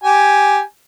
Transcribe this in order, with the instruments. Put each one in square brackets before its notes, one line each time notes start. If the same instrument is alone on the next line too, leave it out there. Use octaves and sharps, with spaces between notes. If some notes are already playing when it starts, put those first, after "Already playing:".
[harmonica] G4 G#5